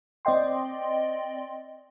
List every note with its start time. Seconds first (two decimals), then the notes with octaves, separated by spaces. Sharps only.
0.25 C4 D5 D#5 G5 C6